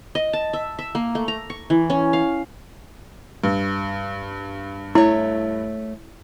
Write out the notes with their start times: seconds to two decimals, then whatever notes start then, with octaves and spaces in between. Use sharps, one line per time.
0.15 D#5
0.33 A5
0.53 E5
0.79 E5
0.95 A#3
1.15 A3
1.28 A#5
1.50 C#6
1.70 E3
1.90 C#4
2.13 F5
3.44 G2
4.95 A3 E4 C#5